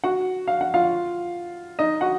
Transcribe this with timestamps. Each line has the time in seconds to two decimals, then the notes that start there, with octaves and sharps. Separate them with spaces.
0.04 F#4 F#5
0.48 F5
0.61 F#5
0.74 F4 F5
1.79 D#4 D#5
2.01 F#4 F#5